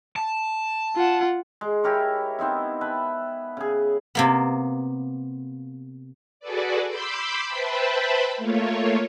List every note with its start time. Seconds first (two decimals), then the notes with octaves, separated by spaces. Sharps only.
0.16 A5
0.96 F4 F#5
1.61 G#3
1.84 E4 G4 A#4 C#5
2.39 B3 C4 D#4 E4
2.81 B4 E5 A5
3.57 C#3 G#4
4.15 C3 A#3 B3
6.40 F#4 G#4 A4 B4 D5
6.87 B5 C6 D6 E6 G6
7.47 B4 C5 E5 G5 A5 B5
8.37 A3 A#3 F4 C#5